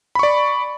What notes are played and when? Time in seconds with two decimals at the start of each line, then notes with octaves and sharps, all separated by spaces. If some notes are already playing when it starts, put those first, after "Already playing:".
0.15 B5
0.19 C#6
0.23 D5